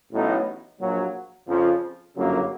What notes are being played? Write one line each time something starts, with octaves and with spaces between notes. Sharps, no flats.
A1 A2 F#3 B3 D#4
A#1 A#2 F#3
F2 C#3 F3
G1 F#2 C#3 F#3 A#3